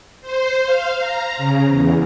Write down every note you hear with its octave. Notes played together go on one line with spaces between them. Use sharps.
C5
F5
A#5
C#3
E2